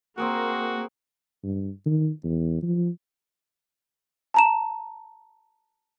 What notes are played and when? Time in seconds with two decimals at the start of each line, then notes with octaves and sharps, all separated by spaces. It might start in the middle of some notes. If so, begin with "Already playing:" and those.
0.18 A#3 C4 F#4 G#4 A#4
1.44 G2
1.86 D#3
2.24 E2
2.63 F3
4.34 A5 A#5 E7